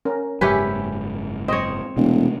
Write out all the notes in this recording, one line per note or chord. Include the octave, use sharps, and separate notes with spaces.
C#4 A#4
F#1 G#2 C#4 G4 B4 E5 G#5
C4 C#5 D#5
E1 C3 A3 C#4